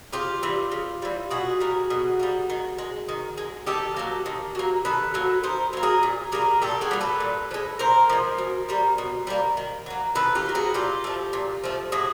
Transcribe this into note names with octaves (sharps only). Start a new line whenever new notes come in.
C#3 F4 G4
E3 G3
C#3
E3 G3
B2 F#4 G#4
G3 A#3
B2
G3 A#3
D#3
G#3
D#3
G#3
D#3 G4 A4
F#3 A#3
D#3
F#3 A#3
D#3 A4 B4
F#3 A#3
D#3 A#4 C5
F#3 A#3
G#4 A#4
A#2
G3 A#3 G#4 A#4
A#2 G4 A4
F#4 G#4
G3 A#3
A4 B4
A#2
F3
G#3
A#2 A#4 C5
F3 G#3
B2
G3 A#3
B2
G3 A#3
D#3
F#3 A#3
D#3 A4 B4
F4 G4
F#3 A#3
F#4 G#4
A#2 F4 G4
F3 A3
A#2
F3 A3
A2 F#4 G#4